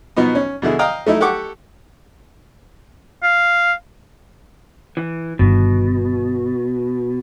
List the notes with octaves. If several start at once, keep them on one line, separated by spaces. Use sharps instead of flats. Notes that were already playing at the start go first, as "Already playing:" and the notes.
B2 F3 B3 D#4
C#4
B2 D3 E4 G#4
D#5 F5 G5 A#5 D#6
A3 D#4 E4
G4 A4 F#5 C#6 D6
F5
E3
G1 G2 B2 D#3